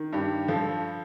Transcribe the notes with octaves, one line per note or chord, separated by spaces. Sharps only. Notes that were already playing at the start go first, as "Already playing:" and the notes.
Already playing: D#3
G2 G4
F3 A4